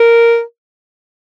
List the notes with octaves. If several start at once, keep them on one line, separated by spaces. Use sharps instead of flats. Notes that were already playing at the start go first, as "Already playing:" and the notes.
Already playing: A#4